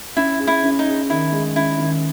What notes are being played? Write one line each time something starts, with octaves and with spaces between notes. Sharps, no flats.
C#4 E4
G#4
E4
C#4
D#4
G#4
D#3 E4
G#3
C#4 E4
D#3